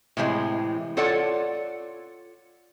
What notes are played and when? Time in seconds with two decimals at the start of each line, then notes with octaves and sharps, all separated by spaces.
0.17 A2 C3 E3 G3 G#3
0.97 F4 A4 C#5 D5 F#5